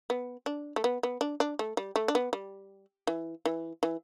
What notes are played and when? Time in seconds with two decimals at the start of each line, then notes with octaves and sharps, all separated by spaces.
0.10 B3
0.46 D4
0.76 A3
0.84 B3
1.03 B3
1.21 D4
1.40 D4
1.59 A3
1.77 G3
1.96 A3
2.08 D4
2.15 B3
2.33 G3
3.07 E3
3.45 E3
3.83 E3